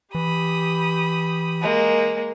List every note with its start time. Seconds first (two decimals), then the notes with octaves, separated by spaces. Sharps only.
0.15 E3 G4 B5 D#6
1.62 G#3 A#3